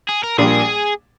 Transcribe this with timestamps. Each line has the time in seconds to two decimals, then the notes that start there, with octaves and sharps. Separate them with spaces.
0.09 G#4
0.24 A#4
0.38 A#1 A#2 G3 D4 G#4